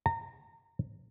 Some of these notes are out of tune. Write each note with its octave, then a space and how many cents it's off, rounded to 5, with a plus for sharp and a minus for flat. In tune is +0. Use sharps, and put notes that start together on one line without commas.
A#5 -25